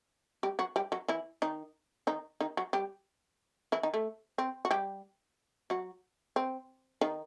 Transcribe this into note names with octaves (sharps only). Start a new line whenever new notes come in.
G3 G4
F#3 F#4
G3 G4
F#3 F#4
E3 E4
D#3 D#4
D#3 D#4
D#3 D#4
F#3 F#4
G3 G4
E3 E4
D#3 D#4
A3
C4
F#4
G3 G4
F#3 F#4
C4
D#3 D#4